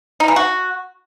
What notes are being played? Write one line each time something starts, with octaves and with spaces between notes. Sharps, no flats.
D#4
E3
F#4